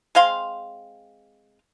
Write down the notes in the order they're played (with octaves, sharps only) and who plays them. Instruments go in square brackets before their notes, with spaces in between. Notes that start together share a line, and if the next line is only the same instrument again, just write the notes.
[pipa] G#3 C4 F5 C6